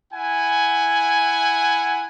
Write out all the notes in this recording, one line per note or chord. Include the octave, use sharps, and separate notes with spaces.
E4 F#5 G#5